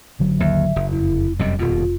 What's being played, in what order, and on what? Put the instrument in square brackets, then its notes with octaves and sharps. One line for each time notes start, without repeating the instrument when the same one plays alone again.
[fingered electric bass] G#1 D3 F#3
[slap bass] D#2 [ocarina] E5
[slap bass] F#1
[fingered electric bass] F1 [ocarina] E4
[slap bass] F#2 C3 G3 [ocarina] D#5
[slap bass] D#1 B2 [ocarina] F4